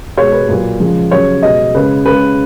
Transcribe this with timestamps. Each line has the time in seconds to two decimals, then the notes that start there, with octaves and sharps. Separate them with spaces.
0.17 B2 G#3 C#5
0.32 B4
0.49 A#2 F#3
0.80 C#3 F3 G#3
1.11 C#3 F#3 C#5
1.43 B2 G#3 D#5
1.75 C#3 G#3 B4
2.06 C#3 G#3 B4